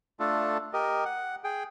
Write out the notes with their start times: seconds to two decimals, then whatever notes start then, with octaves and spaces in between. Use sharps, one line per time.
0.20 A3 D4 F4 A4
0.73 G4 A#4 D#5
1.05 F#5
1.44 G#4 G5